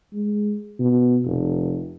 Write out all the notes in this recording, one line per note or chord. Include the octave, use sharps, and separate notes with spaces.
G#3
B2
F1